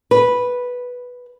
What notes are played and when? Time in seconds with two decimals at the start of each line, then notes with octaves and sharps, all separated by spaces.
0.11 B4